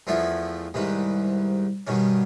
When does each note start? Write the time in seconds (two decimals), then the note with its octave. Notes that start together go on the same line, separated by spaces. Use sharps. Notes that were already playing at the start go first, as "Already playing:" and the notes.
0.07 E2 F3 A3 B3 E4
0.74 C2 G#2 D#3 B4
1.87 G2 B2 D#3 C#4